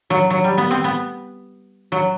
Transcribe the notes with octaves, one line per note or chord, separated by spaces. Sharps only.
F#3
F#3
G3
B3
C4
B3
F#3